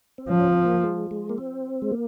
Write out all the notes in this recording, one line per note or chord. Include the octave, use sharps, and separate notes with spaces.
C4
F3 C#4
C4
A#3
G#3
G#3
A#3
C4
G#3
A#3